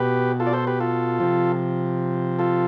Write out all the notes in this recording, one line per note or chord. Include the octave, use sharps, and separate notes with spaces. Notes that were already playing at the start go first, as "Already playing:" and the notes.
Already playing: B2 G4 B4
F4 A4
D5
A4 C5
G4 B4
F4 A4
C3 F3
F4 A4